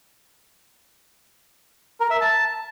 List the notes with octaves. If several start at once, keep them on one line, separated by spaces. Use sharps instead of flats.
A#4
E5
A5